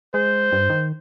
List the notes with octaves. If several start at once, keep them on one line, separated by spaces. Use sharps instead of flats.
G#3 C5
G2
D#3